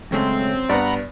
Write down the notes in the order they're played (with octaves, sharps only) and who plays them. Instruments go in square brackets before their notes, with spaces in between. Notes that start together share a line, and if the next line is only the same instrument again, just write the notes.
[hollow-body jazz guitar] C#3 G#3 A3 [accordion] F#3 [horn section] C4 [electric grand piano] C#4
[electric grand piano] G2 B3 [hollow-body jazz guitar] D5 [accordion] F#5 A#5 B5